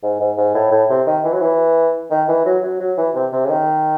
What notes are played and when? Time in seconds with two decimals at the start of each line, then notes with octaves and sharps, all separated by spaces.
0.03 G#2
0.20 G#2
0.38 G#2
0.54 A2
0.72 A2
0.89 C3
1.07 D#3
1.24 E3
1.33 F#3
1.41 E3
2.11 D#3
2.28 E3
2.45 F#3
2.63 F#3
2.80 F#3
2.97 E3
3.15 C3
3.33 C3
3.45 C#3
3.50 D#3